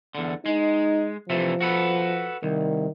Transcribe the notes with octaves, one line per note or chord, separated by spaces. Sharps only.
E2 D3
G#3 D#4
C3 E3 F3 A3
F#4 A4 B4
C2 D#3